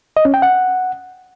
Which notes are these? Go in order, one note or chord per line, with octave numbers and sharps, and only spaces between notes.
D#5
C#4
G5
F#5